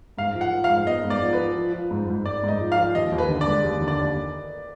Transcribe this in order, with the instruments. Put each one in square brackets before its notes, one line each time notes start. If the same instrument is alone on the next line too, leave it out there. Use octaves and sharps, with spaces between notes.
[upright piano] G#2 [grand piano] F5
[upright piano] F3
[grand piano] F#5
[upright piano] F3
[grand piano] F5
[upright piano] G#2
[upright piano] B3 [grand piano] D#5
[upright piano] G#2
[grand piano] D5
[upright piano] F3
[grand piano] B4
[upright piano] F3
F3
F3
G#2
G#2
[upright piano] G#2 [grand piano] D5
[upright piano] G#2 [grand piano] D#5
[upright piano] F3
[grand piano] F5
[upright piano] F3
[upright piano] D#2 [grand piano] D#5
[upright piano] D#2
[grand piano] B4
[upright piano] D3
[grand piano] D5
[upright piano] G#3
D#2
D3
[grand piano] D5
[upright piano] D#2